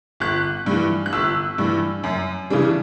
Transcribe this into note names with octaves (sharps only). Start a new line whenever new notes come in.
G1 F#6
G2 E3
F#6
G1 E6
G2 E3
F#2
C#3 E3 G3 D4